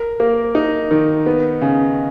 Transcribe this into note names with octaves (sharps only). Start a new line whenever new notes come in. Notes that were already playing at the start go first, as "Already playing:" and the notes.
Already playing: A#4
A#3
D#4
D#3
B3
C#3